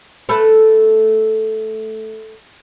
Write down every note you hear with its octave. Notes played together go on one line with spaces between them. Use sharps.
A3 A4 B4